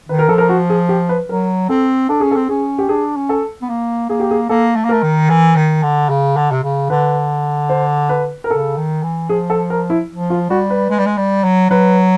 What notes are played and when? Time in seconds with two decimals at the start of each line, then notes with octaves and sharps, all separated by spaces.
0.09 D#3 B4
0.19 A#4
0.28 F3 A4
0.38 A#4
0.49 F#4
0.70 G#4
0.89 G4
1.09 B4
1.29 F#3 A#4
1.69 C4 A4
2.09 D4 A4
2.20 C#4 G#4
2.31 A4
2.36 C4
2.49 C#4 G#4
2.78 G4
2.89 D4 G#4
3.16 C#4
3.29 A4
3.62 B3
3.69 A#3
4.09 A#3 G#4
4.20 G4
4.31 G#4
4.49 A#3 A4
4.76 A3
4.84 A#3
4.89 A3 A#4
5.03 D#3
5.30 E3
5.56 D#3
5.83 D3
6.09 C#3
6.37 D3
6.52 C3
6.63 C#3
6.90 D3 B4
7.69 C5
8.09 B4
8.44 A#4
8.50 C#3 A4
8.77 D#3
9.03 E3
9.29 F3 G#4
9.50 A4
9.70 A#4
9.90 E4
10.10 F3
10.30 F4
10.50 G3 F#4
10.70 B4
10.90 G#3
10.99 G3
11.06 G#3
11.17 G3
11.44 F#3
11.70 F#3 B4